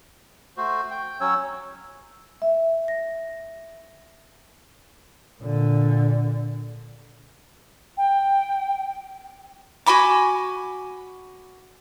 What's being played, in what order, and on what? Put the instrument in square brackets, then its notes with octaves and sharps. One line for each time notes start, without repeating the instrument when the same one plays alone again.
[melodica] A3 F#4 C5
G5
F#3 C#4 C#5 E6
[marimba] E5
A#6
[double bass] A#2 D3
[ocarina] G5
[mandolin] F#4 G#5 B5 D6